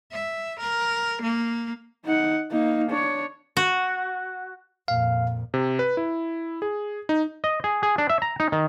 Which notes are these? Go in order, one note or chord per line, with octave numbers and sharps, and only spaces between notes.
E5
A#4
A#3
D#4 F#5
A#3 D#4
D4 C#5
F#4
F2 A#2 F5
C3
B4
E4
G#4
D#4
D#5
G#4
G#4
D4
E5
A#5
D#4
D#3